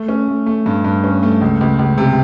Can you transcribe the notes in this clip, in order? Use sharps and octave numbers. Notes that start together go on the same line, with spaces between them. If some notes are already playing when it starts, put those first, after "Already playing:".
Already playing: A3
C#4
A3
A3
G2
G2
C#4
A3
C#2
C#2
C#2
C3